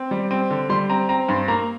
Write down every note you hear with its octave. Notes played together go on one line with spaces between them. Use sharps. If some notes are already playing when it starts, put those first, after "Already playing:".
Already playing: C4
G3
C4
D3
G3 C6
C4 A#5
C4 A#5
G2 C6
A#3 A#5